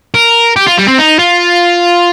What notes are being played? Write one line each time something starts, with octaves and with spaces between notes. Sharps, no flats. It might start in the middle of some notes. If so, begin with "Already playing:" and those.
A#4
G4
F4
G3
C4
D#4
F4